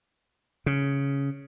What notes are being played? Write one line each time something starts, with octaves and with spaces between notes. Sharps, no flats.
C#3